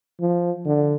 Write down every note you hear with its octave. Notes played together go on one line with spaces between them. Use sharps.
F3
D3